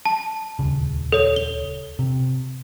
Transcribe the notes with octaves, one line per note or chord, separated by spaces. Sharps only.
A5
D#1 C#2 C#3
A4 C#5
G7
C3